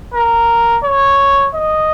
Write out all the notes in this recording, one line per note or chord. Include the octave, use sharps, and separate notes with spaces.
A#4
C#5
D#5